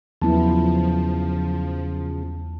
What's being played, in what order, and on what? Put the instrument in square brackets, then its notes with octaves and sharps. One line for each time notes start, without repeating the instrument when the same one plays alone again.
[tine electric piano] E2 A5 [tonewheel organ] C#3 [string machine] F3 [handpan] F#3 B3 E4